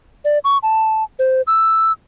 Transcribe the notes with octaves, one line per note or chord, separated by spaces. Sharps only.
D5
C#6
A5
C5
E6